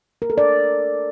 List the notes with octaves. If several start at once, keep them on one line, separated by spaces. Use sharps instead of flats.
A#4
A4
D5